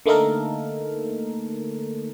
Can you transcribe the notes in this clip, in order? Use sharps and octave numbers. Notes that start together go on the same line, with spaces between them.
D3 A3 A#3 D#4 A4 A#4